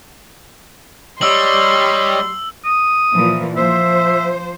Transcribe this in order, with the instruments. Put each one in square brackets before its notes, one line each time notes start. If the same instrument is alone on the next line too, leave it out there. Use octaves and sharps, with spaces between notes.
[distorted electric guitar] G3 [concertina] C#5 D#5 [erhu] C6 [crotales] E6 F#7
[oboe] D#6
[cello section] A#2 E3 F3
[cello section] F3 C5 [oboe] E5